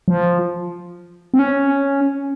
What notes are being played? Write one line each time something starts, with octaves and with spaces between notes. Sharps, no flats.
F3
C4
C#4